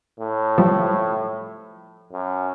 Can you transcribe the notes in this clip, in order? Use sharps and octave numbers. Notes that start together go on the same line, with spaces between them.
A2
F3 G3
F#2